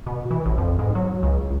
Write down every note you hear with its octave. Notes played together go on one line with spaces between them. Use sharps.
B2
E3
A1
F2
G#2
F#3
C#2